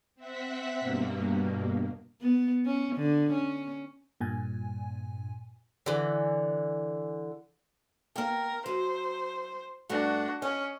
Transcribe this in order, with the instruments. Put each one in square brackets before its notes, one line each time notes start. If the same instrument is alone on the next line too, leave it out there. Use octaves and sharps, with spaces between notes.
[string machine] C4 E5 F#5 B6
G2 B2 A#3
[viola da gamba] B3
C#4
D3
C#4
[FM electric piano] G2 A#2 G#5
[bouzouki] D3 E3
[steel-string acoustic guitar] A#3 G5 [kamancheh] A#4
[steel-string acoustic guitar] F#3 [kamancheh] C5
[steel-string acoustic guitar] G2 A3 [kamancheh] D4 F#4
[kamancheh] C#4 [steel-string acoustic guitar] D#5